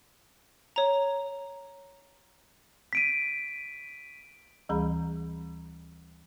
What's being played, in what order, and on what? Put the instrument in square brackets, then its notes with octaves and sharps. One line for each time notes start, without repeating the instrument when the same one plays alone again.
[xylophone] C#5 A#5
[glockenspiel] B6 D7 D#7
[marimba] D2 E3 G3 G#4 A#5 B5